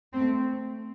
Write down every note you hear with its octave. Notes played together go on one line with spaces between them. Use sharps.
A3 C4